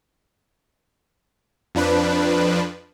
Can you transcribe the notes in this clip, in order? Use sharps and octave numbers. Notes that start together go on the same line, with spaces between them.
F2 F3 D4 B4